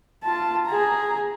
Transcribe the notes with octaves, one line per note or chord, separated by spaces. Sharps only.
F4 A5
G#4 A#5